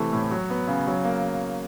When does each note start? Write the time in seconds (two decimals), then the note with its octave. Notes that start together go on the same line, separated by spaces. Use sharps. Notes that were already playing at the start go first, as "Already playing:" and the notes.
Already playing: C3 E3 A3
0.13 A2
0.31 F#3
0.50 B3
0.68 C#3
0.87 F#3
1.05 A#3